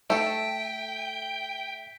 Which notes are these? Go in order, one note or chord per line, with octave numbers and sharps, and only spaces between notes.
A3 A4 E5 G5 G6 B6 D7